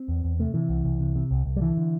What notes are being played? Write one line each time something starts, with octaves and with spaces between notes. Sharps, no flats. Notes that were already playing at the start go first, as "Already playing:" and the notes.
Already playing: C4
E2
E2
C3 A3
C3 E3
C2
C2
C3
C3
C2
C2
G3
D3 E3
D3